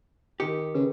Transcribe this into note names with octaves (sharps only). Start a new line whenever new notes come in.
D#3 G4 C#7
C#3 B4